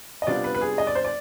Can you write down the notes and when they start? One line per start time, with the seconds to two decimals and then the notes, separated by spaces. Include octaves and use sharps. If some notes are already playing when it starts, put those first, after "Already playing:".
0.22 D#5
0.27 C3 G3 B3 D4 F4 D5
0.44 B4
0.55 B4
0.61 G#4
0.78 D#5
0.87 D5
0.95 C5
1.05 D5